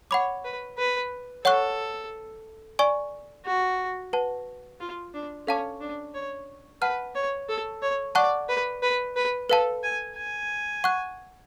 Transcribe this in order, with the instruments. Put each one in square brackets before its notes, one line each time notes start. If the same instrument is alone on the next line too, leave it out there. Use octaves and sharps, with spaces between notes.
[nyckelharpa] C#5 [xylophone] F#5 B5 D6
[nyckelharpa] B4
B4
[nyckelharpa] A4 [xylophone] C#5 F#5 C#6 F#6
[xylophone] D5 G#5 C#6
[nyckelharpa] F#4
[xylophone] B4 F#5 A5
[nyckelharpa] F4
D4
[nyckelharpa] C#4 [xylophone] A4 F5 A5 D6
[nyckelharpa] D4
C#5
[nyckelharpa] B4 [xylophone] F#5 A5 F6
[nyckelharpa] C#5
A4
C#5
[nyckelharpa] D5 [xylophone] F#5 A5 C#6 F#6
[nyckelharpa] B4
B4
B4
[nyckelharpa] A4 [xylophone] B4 F5 A5
[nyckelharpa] G#5
G#5
[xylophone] F#5 C#6 F#6